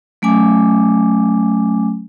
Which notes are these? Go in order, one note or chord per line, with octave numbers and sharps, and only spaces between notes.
F#3 A3 C#4 G#5 D6